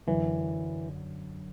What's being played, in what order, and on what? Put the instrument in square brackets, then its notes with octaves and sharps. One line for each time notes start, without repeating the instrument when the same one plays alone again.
[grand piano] F#2 D3 F#3 [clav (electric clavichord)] E3